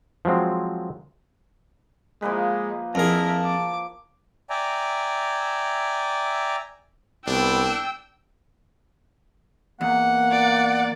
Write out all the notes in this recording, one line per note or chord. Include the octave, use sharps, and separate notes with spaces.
F3 F#3 G#3 C4
F3 G#3 A#3 B4
F2 E4 G#4 A#4 A5
D6
D5 E5 G5 G#5 A#5
C2 B3 D4 G5 E6
E2 A#3 F#5
D5